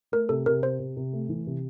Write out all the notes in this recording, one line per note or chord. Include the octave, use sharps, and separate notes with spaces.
A3 A#4
C3 A4
C3 A#4
C3 C5
C3
C3
A3
E3
C3